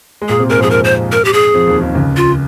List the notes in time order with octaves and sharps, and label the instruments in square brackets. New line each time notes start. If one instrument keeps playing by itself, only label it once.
[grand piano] G#3
[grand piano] A#2 A#3 [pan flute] G#4
[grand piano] C3 C4
[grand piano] G#2 G#3 [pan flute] A#4
[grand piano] F2 F3 [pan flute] G#4
[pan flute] A#4
C5
A#4
G4
G#4
[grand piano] F2 F3
D#2 D#3
D#2 D#3
C#2 C#3
[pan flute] F4